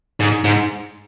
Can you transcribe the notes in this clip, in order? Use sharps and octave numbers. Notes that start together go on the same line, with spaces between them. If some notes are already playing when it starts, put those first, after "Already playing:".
G#2
G#2